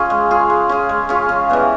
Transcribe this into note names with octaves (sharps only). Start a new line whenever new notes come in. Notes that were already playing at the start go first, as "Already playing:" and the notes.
Already playing: C#4 F4 G#4
G#3
C#4 F4 G#4
G#3
C#4 F4 G#4
G#3
C#4 F4 G#4
C#3
E3 G3 B3